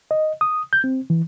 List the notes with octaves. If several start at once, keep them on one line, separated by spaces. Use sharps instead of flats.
D#5
D#6
G6
C4
E3